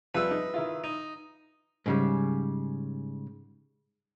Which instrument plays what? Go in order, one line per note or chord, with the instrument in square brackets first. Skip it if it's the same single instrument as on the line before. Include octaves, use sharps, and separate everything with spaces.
[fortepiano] F2 G3 F4 [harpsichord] B4 E5
[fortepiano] D#4
D#3 E4 F4
[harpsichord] D#4
[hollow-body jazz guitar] G#2 C#3 G3